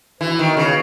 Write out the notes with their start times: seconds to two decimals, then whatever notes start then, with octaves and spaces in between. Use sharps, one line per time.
0.21 E3 B3 F#4 B4
0.39 D#3
0.57 C#3